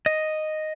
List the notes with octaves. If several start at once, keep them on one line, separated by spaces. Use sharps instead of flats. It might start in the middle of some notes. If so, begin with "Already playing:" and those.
D#5